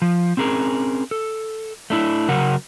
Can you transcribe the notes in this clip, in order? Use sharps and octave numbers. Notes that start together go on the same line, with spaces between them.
F3
C4 C#4 G#4 A#4
A4
A3 D4 E4
C#3 F#3 A#4 F#5